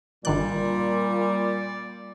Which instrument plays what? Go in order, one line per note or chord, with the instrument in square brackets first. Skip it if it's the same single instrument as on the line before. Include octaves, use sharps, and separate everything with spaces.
[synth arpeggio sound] G1 D#3 F#6 [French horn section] A#2 [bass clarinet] G3 [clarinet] D5